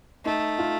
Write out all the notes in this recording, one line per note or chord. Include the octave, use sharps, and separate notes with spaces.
A3 D#4
F4